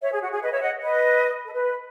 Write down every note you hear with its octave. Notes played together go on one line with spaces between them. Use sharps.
C#5 E5
G#4
F#4
G#4
B4 D#5
C#5 E5
D#5 F#5
B4 D#5
A4
B4